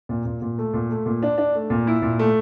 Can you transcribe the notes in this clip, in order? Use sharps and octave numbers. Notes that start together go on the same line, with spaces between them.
A#2
A#2
A#2
A3
A#2
A3
A#2
D4
D4
A3
A#2
E4
A#2
A3